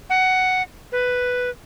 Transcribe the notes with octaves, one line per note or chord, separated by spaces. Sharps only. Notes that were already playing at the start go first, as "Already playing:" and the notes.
F#5
B4